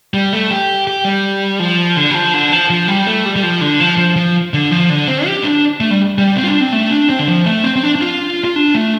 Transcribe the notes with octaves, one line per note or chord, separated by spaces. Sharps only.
G3
A3
G4
G4
G3
F3
D3
G3
F3
D3
F3
F3
G3
A3
G3
G3
F3
D3
F3
F3
F3
D3
F3
D3
C4
G4
D4
A3
G3
G3
C4
F4
D4
C4
A3
D4
C4
D3
F3
A3
C4
C4
D4
D4
F4
F4
D4
A3